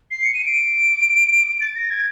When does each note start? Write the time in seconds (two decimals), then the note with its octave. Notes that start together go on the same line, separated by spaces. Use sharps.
0.11 C7
0.23 C#7
0.34 D#7
0.45 D7
1.61 A6
1.76 A#6
1.90 G#6